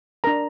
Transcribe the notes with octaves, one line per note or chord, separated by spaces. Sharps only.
D4 A#4 A#5